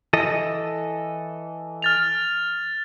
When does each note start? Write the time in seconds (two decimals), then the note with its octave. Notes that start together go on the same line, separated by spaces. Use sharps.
0.13 E3 A4 D#5
1.82 F6 A6 F7